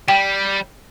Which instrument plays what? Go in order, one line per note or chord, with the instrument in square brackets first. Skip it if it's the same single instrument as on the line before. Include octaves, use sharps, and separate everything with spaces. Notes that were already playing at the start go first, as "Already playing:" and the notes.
[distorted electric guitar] G3 [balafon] G5